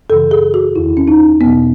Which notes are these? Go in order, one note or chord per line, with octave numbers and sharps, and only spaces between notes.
F#2 C#3 E3 A4
G#4
F#4
E2 D#3 E4
C#4
D#4
E2 B2 B3